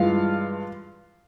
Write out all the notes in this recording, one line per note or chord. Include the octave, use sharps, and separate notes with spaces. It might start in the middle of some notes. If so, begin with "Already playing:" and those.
Already playing: G2 E3 G#3 F4 F5